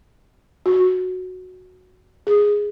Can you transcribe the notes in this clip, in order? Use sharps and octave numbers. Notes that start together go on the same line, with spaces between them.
F#4
G#4